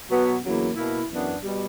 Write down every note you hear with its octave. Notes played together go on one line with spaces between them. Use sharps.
B2 F#3 B3
E2 C#3 F#3 A#3 E4
B2 A#3 E4
F#2 E3 B3 D4
B2 G3